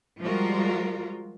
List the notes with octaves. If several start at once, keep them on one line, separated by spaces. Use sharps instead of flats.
F3 G3 G#3 F4 F#4 A#4